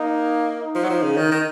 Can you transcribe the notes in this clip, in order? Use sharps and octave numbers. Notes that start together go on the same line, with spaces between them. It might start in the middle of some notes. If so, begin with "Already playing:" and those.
Already playing: A#3 D#4
D#4
F3
F#3
F3
C#3
D#3
D#3